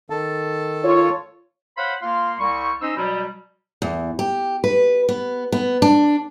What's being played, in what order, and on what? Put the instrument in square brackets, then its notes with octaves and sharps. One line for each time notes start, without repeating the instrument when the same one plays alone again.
[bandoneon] D#3 A4 A5
[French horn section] F4 C#5
[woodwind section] C5 C#5 F5 F#5 B5 C6
A#3 F4 F5 C6
C2 G3 C#6
C#4 D#4 C5 D#5 E6
B2 F#3 G3
[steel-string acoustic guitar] E2
G4
B4
B3
B3
D4